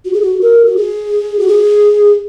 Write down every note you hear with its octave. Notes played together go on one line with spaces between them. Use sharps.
F#4
G#4
F#4
A#4
F#4
G#4
F#4
G#4